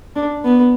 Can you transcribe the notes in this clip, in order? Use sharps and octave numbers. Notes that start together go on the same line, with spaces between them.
D4
B3